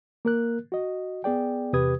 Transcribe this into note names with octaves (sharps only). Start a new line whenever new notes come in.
A#3 A#4 F#6
F#4 D#5
B3 G#4 D5 G5
E2 C3 G4 B4 D#6 G#6